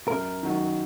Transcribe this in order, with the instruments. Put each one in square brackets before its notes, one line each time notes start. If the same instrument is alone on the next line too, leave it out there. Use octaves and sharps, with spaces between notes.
[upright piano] F#2 [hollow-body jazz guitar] A#4
[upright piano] D#3 F#3